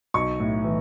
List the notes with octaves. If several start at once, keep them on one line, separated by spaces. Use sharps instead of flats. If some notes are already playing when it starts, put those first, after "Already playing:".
B1 C#6
A2
E3